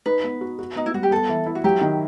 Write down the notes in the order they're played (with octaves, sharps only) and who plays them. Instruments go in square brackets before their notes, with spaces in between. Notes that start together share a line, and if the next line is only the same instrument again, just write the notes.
[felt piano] D#4 [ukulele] B4
[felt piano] B3
F#4
F#4
[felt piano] B3 [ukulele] D#4
[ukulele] E4
[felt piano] G3 [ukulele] F#4
[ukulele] G4
[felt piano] B3 [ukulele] A4
[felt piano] E3
E4
[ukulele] F#4
[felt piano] F#3 [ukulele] G4
[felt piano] D#3